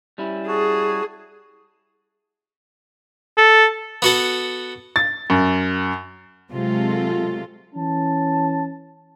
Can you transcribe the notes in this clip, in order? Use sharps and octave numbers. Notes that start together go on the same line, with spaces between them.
G3 C#4 E4
F#4 G#4 A5
A4
B3 F#4 A4
A6
F#2
C3 F#3 G#3 C4 F4 A4
E3 C#4 A5